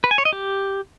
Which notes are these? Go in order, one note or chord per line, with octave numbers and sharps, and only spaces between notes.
B4
G#5
C#5
D#5
G4